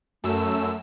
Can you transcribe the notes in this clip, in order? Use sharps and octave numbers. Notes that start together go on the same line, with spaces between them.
F#2 A3 E6